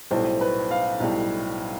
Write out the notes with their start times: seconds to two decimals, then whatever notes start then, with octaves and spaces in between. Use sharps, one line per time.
0.11 B1 A2 G3 C5
0.41 B4
0.71 F5
1.00 B1 A2 G3